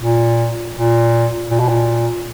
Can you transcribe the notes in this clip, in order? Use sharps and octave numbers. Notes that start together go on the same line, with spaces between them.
A#2
A#2
A#2
B2
A#2